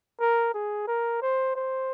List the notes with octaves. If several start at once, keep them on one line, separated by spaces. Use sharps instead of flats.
A#4
G#4
A#4
C5
C5